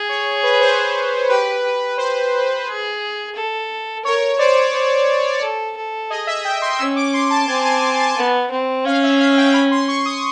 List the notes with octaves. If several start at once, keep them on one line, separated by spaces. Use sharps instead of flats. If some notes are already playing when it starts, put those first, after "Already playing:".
Already playing: G#4
C#5
B4
C5
G4 B4
G4
C5
G#4
A4
A#4 C#5
C5 D5
C5
A4
A4
G#4 D#5
E5
G5
C6
C#4 E6
D6
C6
A5
C4 G#5
G#5
G#5
A5
B3
C4
C#4 F5
E5
F5
G5
B5
C6
C#6
D#6